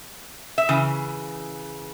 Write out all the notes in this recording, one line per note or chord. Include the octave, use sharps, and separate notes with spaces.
E5
C#3 E3